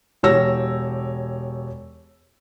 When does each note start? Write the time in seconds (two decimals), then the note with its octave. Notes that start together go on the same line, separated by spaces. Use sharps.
0.23 E1 G4 C#5 E6 A#6